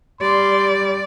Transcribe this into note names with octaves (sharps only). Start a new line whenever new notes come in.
G3 D5 C6